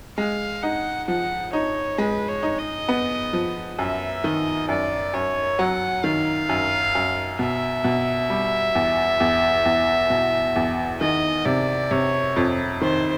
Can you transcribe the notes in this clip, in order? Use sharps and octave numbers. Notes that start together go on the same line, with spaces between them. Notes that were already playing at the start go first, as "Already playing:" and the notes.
G#3 F5
D#4 F#5
F3 F#5
D#4 C#5
G#3 B4
C#5
D#4
D#5
B3
F3
F#2 E5
D#3 D#5
F#2 D5
F#2 C#5
F#3 F#5
D#3 F5
F#2
F#2
B2 E5
B2
G3
E2
E2
E2
B2
E2
D#3 D#5
C3 D5
C3 C#5
F2
D#3 C5